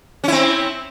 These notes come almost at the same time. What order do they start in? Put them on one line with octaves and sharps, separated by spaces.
C#4 E4 C4